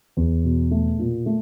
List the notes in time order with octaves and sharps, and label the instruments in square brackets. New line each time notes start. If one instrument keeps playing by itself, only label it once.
[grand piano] E2
B2
A3
A#2
A3